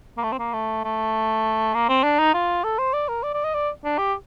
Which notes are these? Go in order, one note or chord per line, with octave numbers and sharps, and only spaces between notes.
A#3
A3
C4
A#3
A3
A3
A#3
C4
D4
D#4
F4
A4
C5
D5
A#4
D5
D5
D#5
D5
D4
G4